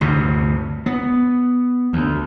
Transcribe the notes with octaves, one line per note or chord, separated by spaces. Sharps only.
D2 G2 C3
B3
D2